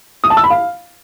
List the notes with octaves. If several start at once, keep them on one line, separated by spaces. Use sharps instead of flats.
D#6
A5
E6
B5
F5